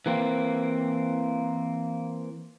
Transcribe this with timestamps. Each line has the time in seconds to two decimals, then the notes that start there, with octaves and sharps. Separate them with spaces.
0.06 E3 A#3 C4